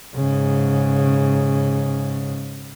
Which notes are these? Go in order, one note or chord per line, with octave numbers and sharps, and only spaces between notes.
G#2 C#3